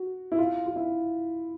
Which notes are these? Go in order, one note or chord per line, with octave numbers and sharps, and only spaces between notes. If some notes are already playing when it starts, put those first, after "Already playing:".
Already playing: F#4
E4
F4
F4
E4